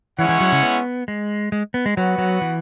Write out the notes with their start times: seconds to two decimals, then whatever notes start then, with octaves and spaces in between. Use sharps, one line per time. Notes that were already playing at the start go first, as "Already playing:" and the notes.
0.18 E3 G#3 C#4 E4 C#5 F#5
0.29 E3
0.40 F#3
0.52 C#3
0.63 B3
1.08 G#3
1.52 G#3
1.74 B3
1.86 G#3
1.97 F#3 B3 F#4 B4 F#5
2.18 F#3
2.42 E3